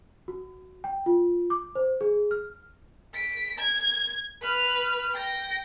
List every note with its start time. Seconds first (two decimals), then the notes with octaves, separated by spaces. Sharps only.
0.28 F#4
0.84 G5
1.06 F4
1.50 D6
1.75 C5
2.01 G#4
2.31 F6
3.14 B6 D7
3.59 G#6
4.42 B4 F6
5.14 G5 A#6